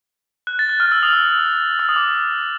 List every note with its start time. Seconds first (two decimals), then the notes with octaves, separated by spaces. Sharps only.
0.47 F#6
0.59 A6
0.69 F#6
0.80 F6
0.92 E6
1.03 D#6
1.09 F6
1.13 E6
1.79 E6
1.89 D#6
1.96 D6